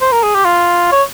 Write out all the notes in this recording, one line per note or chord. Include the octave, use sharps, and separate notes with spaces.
C5
A#4
G#4
G4
F4
C#5